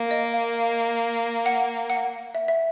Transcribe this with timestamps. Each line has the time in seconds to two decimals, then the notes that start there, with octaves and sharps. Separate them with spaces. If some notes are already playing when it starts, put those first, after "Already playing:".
Already playing: A#3
0.11 D#5
0.33 F5
1.46 F#5
1.90 F#5
2.35 E5
2.48 E5